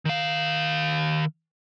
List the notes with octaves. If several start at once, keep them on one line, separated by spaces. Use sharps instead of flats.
D#3 F5